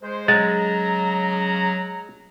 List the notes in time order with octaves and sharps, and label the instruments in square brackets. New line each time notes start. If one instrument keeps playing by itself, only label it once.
[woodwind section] G#3 C5
[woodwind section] C#3 F#3 A#5 [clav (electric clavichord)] G#3 F#5 [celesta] A6